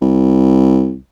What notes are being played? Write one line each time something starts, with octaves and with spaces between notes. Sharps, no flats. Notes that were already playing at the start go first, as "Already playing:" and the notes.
C2